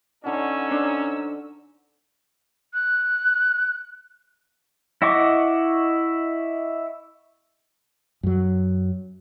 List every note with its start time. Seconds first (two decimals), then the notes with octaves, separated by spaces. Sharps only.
0.25 D3 C#4 D#4 F#4 A4 E6
0.71 D4 C5
2.74 F#6
5.02 E4 D#5 F#5 C#6 D6
8.23 F#2 F#3